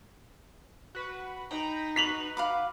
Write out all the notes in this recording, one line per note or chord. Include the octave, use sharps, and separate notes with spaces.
F#4 B4
D#4 G5 A#5 B5
F#4 B4 B6 F7 F#7
F5 B5 D6